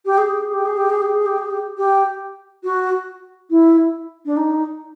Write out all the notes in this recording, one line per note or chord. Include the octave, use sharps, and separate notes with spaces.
G4
G#4
G4
G#4
G4
G#4
G4
G#4
G4
G#4
G4
G#4
G4
G4
F#4
E4
D4
D#4